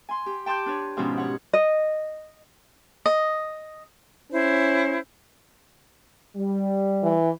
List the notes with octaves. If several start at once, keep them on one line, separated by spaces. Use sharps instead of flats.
G#5 C6
G4
G5 A5 C6 D6 G6
D4 B4 C#5
G#2 B2 F3 C#4 G4
C#5 F#5
D#5
D#5
C#4 E4 C5
G3
E3